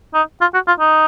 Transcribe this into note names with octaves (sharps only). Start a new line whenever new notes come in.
D#4
F4
F#4
F4
D#4